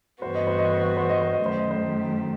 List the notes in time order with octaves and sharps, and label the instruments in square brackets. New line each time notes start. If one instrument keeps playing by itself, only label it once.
[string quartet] G2 E3 G3 B3 F#4 [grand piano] C5
[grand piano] D#5
C5
D#5
C5
D#5
C5
D#5
C5
D#5
[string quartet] F#2 D#3 A3
[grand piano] C5
D#5
C5